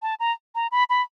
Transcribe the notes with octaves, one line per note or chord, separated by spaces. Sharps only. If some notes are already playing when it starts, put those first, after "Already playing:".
A5
A#5
A#5
B5
B5